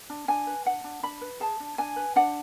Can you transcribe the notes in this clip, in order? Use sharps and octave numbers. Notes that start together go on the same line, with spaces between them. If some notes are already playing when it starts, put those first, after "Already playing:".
D4
D4 G#5
B4
D4 F#5
D4
D4 B5
B4
G#4 A5
D4
D4 G#5
B4
D4 F#5